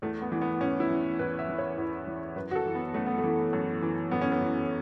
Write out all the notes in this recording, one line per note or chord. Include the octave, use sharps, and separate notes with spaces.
E2 A3
B3
E3
B3
E2 C#4
E4
E3
E2 B4
E5
E3
C#5
E2
E3
F#2 B4
F#4
A4
E3
B3
F#2 A3
B3
A3
E3
F#2
E3
F#2 B3
C#4
B3
E3